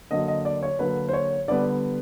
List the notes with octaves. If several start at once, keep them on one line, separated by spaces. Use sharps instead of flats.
D3 F#3 A#3 D#5
D#5
D5
C#5
D3 F#3 A#3 B4
C5
C#5
D3 G3 B3 D5